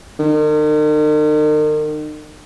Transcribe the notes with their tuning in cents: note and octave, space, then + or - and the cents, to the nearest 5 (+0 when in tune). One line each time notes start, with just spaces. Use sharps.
D#3 -40